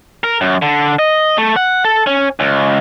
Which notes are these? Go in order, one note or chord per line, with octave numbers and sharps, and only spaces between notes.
A#4
F#2
D3
D#5
A3
F#5
A4
C#4
C#2